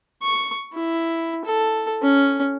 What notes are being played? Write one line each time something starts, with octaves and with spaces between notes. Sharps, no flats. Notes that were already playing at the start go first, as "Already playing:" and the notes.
C#6
E4
A4
C#4